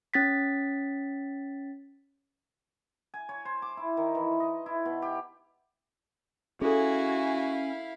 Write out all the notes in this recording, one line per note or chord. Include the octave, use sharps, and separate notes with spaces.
C#4 A6 B6
G#5
C#5
C5
D6
E4
D#3
E3
D#5
E4
B2
G4
C#4 E4 F#4 G#4 A4 F5 G#5